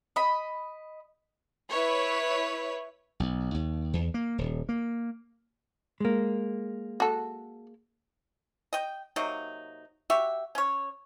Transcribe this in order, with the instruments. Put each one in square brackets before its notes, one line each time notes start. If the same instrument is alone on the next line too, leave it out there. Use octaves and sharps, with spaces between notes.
[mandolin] D#5 B5
[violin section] E4 B4 C#5
[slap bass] B1
D#2
E2
A#3
D#1
A#3
[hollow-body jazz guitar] G#3 A#3
[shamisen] F#4 A4
[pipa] D#5 G5
C3 F#3 A#3 D#4
F#4 G4 E5
C#4 C#5